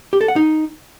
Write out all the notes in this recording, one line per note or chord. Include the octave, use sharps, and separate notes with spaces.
G4
A4
F#5
D#4